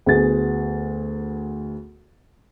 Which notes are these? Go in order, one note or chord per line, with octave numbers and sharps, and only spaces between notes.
D2 B3 G#4 A6